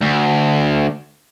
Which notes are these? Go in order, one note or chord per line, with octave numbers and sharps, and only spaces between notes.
D2